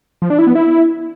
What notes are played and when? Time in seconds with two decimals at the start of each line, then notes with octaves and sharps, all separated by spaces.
0.22 F3
0.30 D4
0.39 E4
0.47 B3
0.55 E4